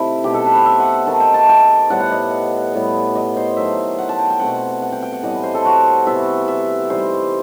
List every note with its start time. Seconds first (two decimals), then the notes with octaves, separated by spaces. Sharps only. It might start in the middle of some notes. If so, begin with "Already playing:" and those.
Already playing: C3 D#3 A3 E4
0.24 B2 A3 D#4 G4
0.34 A4
0.45 B4
0.55 C5
0.66 E5
0.79 F#5
1.07 D#3 A3 D#4 A5
1.20 G5
1.34 A5
1.49 G5
1.90 A2 G3 B3 F#5
2.01 F#5
2.11 D#5
2.74 A2 G3 B3
3.15 D#5
3.37 C5
3.57 D#3 F#3 A3 E5
3.98 F#5
4.09 A5
4.19 G5
4.30 G5
4.40 B2 A3 C4 F#5
4.82 F#5
4.92 G5
5.03 G5
5.12 F#5
5.23 A2 E3 G3 D#5
5.33 D#5
5.43 C5
5.54 A4
5.65 F#4
6.06 C3 E3 B3 E5
6.48 E5
6.89 E3 G3 D#4 C5